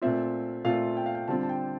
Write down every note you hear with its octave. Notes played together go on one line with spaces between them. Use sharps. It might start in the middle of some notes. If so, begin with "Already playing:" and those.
A#2 A3 C4 F4 E5
A#2 A3 C4 F4 F5
G5
F5
G5
D3 G3 C4 F4 A5
A5
G5